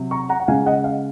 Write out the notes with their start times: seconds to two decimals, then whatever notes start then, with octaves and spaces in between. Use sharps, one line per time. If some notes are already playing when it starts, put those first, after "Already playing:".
Already playing: C3 F#3
0.11 A#5 C#6
0.29 F#5 A#5
0.40 F#5
0.48 C#3 G#3 F5 G#5
0.66 D#5 F#5
0.84 F5